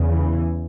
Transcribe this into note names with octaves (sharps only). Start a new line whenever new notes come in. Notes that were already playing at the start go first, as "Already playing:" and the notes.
Already playing: E2 C#3
E3